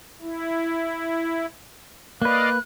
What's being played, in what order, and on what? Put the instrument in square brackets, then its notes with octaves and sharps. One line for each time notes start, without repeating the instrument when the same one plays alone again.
[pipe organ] E4
[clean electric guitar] A#3 B4 [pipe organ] D5 D#5 F5 [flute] F#6